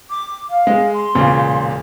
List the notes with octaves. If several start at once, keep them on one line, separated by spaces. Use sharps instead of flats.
D6
F5
G#3
C6
E1 A#2 C#3